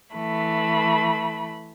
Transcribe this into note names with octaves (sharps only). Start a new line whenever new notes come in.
E3 A3 B5